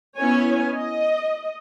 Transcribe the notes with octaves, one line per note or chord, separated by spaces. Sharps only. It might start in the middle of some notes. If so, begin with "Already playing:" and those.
B3 C#4 E4 C#5 G#5
D#5